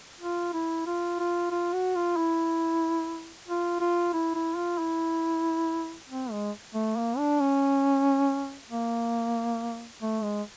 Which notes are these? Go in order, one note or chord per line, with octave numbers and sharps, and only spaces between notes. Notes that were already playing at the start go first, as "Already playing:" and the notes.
F4
E4
F4
F4
F4
F#4
F4
E4
F4
F4
E4
E4
F4
E4
C4
G#3
A3
A#3
D4
C#4
A#3
A3
G#3